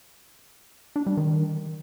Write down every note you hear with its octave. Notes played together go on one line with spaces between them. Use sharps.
D4
G3
D#3